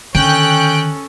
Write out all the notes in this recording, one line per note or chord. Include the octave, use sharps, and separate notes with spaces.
D3 D#3 C#4 A4 G5 F#6